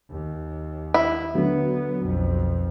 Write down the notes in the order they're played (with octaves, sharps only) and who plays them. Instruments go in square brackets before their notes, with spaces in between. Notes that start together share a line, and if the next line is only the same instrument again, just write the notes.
[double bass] D#2
[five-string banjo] E4
[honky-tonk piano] D3 F#3 [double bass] B3
[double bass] B1 F2